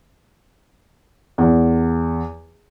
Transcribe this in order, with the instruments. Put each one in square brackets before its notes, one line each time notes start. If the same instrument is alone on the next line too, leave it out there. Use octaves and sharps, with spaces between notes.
[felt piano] E2